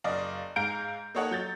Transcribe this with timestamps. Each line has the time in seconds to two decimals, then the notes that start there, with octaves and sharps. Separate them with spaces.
0.04 F#1 D5 D#5 F5
0.56 G#2 G#3 F5 A#5 G6 D7
1.15 A#3 D#4 A4 C#5 D#5 F#5
1.31 F#3 G6 A6